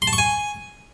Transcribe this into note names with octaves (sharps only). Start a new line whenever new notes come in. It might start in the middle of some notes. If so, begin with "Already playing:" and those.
C6
A5
C#6
G#5